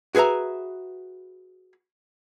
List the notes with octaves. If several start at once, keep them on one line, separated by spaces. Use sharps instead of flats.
F#4 G#4 B4 E5 A#5